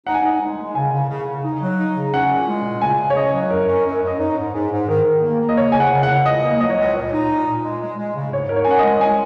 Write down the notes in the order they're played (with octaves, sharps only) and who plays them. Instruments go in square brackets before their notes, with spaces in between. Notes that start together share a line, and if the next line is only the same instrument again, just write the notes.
[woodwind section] D#4 [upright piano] F#5
[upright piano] G#5
[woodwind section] D#4 [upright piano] F#5
[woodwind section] G#3
G#3
[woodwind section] C#3 [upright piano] G#5
[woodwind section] C#3
C#3
C#3
D#4
F#3
D#4
C#3
[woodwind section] C#4 [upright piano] F#5
[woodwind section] A#2
G#3
A#2
[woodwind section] C#3 [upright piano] G#5
[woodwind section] C#3
[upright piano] C#5
[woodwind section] C#4 [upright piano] D#5
[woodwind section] F#3
[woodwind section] F#2 [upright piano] A#4
[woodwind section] C#4
F#2
F#2
[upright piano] D#5
[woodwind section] D#4 [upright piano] C#5
[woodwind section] G#2
[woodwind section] G#2 [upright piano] G#4
[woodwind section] G#2
[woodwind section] D#3 [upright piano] A#4
[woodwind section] D#3
A#3
A#3
[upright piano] D#5
[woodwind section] C#3 [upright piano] C#5
[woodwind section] C#3 [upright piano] G#5
[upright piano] F#5
[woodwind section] C#3
[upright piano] F#5
[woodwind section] C#3
[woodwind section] C#2 [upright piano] D#5
[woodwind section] A#3
[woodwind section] F#3 [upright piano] D#5
[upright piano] C#5
[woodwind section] C#2 [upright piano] D#5
[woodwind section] A#2
D#4
A#2
A#2
G#3
G#3
G#3
C#3
[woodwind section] G#2 [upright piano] C#5
[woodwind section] G#2 [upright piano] A#4
[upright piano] C#5
G#5
[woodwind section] C#4 [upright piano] F#5
[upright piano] D#5
[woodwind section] G#3
[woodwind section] G#3 [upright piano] G#5